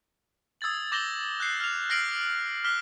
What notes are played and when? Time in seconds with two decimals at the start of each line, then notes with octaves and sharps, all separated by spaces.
0.61 D#6 E6 G#6 A6 F#7
0.92 D6 G6 A#6 E7 F#7 G7
1.40 F#6 G6 C7 C#7
1.60 F6 F7
1.90 F6 A#6 C7 D7 F#7
2.64 D6 F6 F#6 B6 G7